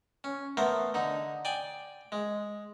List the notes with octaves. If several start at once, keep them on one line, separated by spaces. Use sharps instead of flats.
C#4
A3 B3 A#4 C5
D3 D#4
D5 G5 G#5
G#3